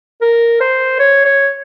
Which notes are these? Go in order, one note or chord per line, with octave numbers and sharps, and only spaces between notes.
A#4
C5
C#5
C#5